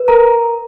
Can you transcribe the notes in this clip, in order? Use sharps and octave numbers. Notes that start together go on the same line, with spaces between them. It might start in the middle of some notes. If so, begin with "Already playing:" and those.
Already playing: B4
A#4 A#5